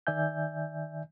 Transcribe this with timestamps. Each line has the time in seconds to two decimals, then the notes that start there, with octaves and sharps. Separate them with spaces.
0.07 D#3 D5 E5 G#5 G6